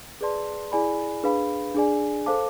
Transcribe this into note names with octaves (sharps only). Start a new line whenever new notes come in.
G#4 B4 D5 A5 C6
E4 G#4 D5 G#5 B5
D4 G#4 B4 F5 B5
D4 G#4 D5 G#5
A4 C5 F5 A5 D6